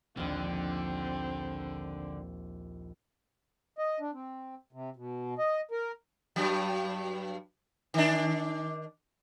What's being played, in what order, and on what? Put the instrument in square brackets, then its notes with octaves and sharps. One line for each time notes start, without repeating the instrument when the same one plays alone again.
[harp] A#1 D#2 [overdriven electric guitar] D3 [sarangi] C4
[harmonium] D#5
D4
C4
C3
B2
D#5
A#4
[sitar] G2 F#3
D#3 D4